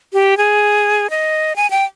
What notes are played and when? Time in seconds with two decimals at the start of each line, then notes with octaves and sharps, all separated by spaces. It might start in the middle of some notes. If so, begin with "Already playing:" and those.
0.13 G4
0.38 G#4
1.10 D#5
1.56 G#5
1.70 G5